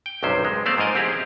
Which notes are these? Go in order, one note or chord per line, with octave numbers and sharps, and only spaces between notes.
G5
B1 G2 C3 D#3 C#4 C5
G#3
A3 B3 C4 C5 D5 F5
G#2 F3 A#3 A#4 D#5 F5
C4 E4 G4 G#4